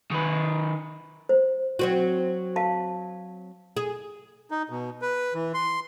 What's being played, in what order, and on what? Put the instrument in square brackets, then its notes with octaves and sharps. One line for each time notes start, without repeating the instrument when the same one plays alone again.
[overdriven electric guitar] D#3 B4
[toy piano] C5
[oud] F#3 C4 F#4
[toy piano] F5 A5
[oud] G#4
[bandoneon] D#4
B2
B4
E3
C6